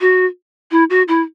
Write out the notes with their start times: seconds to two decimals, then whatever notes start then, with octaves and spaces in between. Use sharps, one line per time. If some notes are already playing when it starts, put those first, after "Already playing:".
0.01 F#4
0.71 E4
0.90 F#4
1.08 E4